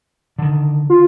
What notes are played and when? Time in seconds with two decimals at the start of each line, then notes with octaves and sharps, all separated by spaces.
0.39 D3 D#3
0.90 F4